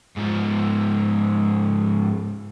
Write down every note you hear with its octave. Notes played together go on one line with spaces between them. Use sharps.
G#2 F3